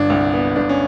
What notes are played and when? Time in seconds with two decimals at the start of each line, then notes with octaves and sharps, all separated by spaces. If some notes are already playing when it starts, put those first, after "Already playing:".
Already playing: G1 D4
0.10 C2
0.33 B3
0.56 G1 D4
0.69 C#4